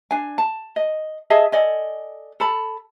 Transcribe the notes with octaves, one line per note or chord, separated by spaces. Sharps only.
D4 G#5
A5
D#5
G#4 D#5 E5 A5
A4 D5 D#5 G#5
A4 A5 B5